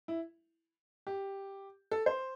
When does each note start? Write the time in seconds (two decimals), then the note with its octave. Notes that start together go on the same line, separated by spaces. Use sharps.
0.08 E4
1.07 G4
1.91 A4
2.06 C5